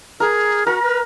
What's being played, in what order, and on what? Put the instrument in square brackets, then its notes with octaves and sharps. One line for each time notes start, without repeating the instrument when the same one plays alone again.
[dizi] G#4 [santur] A#4
[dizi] F#4 [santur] A#4
[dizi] B4